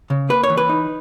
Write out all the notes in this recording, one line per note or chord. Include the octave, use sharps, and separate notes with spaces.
C#3
A#3 B4
C#5
E3
B4
D#4